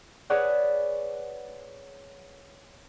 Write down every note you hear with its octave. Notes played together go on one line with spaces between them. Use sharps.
G#4 B4 C#5 D5 F#5